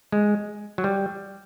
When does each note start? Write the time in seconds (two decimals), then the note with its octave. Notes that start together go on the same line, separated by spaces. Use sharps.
0.12 G#3
0.78 F#3
0.84 G3